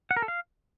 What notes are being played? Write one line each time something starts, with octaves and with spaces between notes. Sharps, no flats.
F#5
A#4
A4
F5